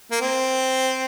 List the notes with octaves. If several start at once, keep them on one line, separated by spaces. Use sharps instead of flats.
A#3
C4